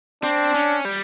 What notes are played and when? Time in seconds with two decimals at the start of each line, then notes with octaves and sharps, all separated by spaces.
0.23 C4 D4
0.54 C#4
0.85 G3